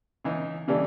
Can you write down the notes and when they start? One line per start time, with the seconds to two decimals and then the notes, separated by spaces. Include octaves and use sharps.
0.25 C#2 E3 D#4
0.68 C#3 E3 G3 A3 D4